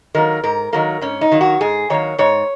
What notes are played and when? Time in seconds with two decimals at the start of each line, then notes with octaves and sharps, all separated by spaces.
0.15 D#3 F#3 A#3 A#4
0.44 G#2 A#4
0.73 D#3 F#3 A#3 A#4
1.01 G#2 C#4
1.21 D#4
1.32 D#3 F#3 A#3
1.41 F#4
1.61 G#2 G#4
1.90 D#3 F#3 A#3 C#5
2.18 G#2 C#5